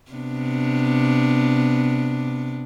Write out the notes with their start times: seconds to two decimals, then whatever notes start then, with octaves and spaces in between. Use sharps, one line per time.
0.11 C3 B3 D4